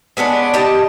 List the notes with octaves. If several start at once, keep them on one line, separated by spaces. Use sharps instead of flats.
G#3 B3 C#4 D4
G4 D#5 A5